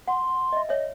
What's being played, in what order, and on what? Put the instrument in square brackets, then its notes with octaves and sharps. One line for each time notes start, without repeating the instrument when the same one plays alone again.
[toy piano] F#5 [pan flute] C6
[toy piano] D#5 E5
[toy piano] C#5 E5 [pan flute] D#5